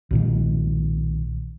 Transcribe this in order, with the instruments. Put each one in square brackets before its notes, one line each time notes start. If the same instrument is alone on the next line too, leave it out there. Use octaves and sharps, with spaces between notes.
[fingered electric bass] B1 A#2 D#3